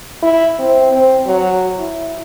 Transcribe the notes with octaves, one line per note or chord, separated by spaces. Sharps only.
E4
C4
C4
F#3
E4